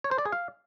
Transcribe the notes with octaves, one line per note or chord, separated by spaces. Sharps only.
C#5
C5
D5
G#4
F5